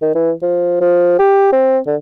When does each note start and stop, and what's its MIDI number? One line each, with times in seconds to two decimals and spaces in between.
0.02 0.12 51
0.15 0.32 52
0.42 0.76 53
0.81 1.18 53
1.19 1.50 67
1.52 1.79 60
1.87 1.96 50